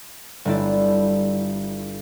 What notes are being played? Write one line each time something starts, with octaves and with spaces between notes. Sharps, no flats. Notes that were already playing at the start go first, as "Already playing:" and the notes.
G1 A3 D4 E4 A4 D5